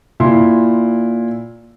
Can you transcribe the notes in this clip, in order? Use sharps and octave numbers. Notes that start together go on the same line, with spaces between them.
A#2 E4 C6